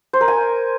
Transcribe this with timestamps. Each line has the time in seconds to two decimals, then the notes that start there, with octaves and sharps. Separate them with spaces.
0.13 C5
0.21 A#4
0.28 G#5